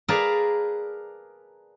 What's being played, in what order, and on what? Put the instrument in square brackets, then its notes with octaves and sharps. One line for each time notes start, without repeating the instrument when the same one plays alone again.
[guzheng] G#4 A#4 B4 D5 F5 A5